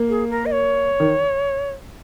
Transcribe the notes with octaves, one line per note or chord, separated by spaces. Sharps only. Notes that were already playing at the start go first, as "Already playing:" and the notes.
Already playing: A#3
G#4
A#4
D#5
C#5
D#3